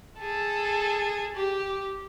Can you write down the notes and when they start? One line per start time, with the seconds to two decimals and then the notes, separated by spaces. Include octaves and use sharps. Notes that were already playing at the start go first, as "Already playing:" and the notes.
0.20 G#4 A4
1.35 G4